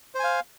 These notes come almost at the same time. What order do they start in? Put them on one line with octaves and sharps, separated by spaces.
C5 G#5 F5